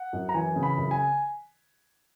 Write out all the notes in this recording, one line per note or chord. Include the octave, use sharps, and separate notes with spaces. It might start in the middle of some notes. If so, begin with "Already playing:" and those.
Already playing: F#5
F#2
A#5
E3 G#5
C#3
B5
F#2
G#5